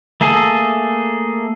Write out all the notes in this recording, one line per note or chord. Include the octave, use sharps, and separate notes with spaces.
A3 A#3 G#4 A4